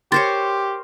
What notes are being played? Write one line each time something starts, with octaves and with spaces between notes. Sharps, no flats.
G4 A#4 C5 C#5 C6 A6